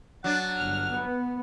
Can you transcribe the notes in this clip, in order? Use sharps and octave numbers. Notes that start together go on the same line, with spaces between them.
F#3 D4 F#5 A6
G1 F6
B3